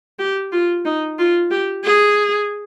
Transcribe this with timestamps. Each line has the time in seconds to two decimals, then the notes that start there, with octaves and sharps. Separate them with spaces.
0.19 G4
0.52 F4
0.85 D#4
1.19 F4
1.51 G4
1.84 G#4